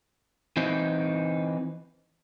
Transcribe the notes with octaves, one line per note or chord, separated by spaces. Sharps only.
E3 C4 D#4